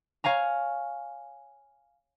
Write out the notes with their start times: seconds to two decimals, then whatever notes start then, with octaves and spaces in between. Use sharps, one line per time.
0.24 C#5 F5 G#5 A#5